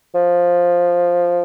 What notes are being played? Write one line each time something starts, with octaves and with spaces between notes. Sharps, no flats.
F3